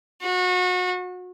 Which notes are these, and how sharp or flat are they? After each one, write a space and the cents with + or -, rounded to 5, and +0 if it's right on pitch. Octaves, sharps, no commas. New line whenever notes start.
F#4 -30